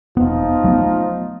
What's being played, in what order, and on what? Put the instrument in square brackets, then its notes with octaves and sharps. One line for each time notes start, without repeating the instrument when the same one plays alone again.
[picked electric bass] E1 B3 [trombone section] F3 D#4 F4
[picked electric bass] F#3 A3 B3